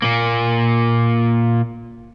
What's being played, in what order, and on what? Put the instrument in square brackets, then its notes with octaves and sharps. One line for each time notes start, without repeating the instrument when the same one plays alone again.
[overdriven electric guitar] A#2 A#3